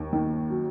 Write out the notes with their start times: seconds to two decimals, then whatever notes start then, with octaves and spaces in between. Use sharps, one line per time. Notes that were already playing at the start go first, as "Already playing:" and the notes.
Already playing: D#2
0.13 D#3
0.50 F#3